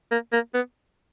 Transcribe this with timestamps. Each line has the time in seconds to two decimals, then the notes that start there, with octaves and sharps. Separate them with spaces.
0.11 A#3
0.33 A#3
0.54 B3